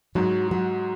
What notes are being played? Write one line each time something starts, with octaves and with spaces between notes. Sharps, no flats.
G#2 F#3
F#3